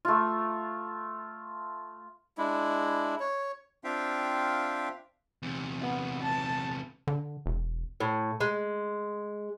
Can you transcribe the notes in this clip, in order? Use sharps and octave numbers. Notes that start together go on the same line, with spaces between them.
A3 F4
G#3 D4 E4
C#5
C4 D4 F4 E5 F5 G5
E2 C3
B3
A5
D3
E1
A2
G#3